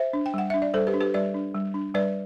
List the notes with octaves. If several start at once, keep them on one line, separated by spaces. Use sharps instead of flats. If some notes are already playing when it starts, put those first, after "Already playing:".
Already playing: C5 E5
D4
G5
G3 F#5
D4 E5
D5
G3 A4 C5
G4 B4
D4
G4 B4
G3 B4 D5
D4
G3
D4
G3 B4 D5